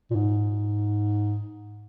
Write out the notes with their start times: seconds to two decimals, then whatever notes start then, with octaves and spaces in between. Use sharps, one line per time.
0.10 A#2
0.16 G#2